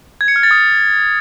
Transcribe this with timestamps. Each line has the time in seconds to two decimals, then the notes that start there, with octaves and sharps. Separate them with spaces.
0.21 G#6
0.28 C#7
0.36 F6
0.43 A6
0.51 D#6